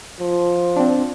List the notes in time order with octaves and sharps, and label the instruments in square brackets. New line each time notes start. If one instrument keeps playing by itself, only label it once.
[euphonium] F3
[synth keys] C4 D4